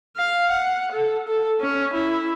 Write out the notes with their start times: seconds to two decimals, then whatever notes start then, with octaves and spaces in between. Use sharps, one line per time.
0.17 F5
0.50 F#5
0.92 A4
1.28 A4
1.61 C#4
1.93 E4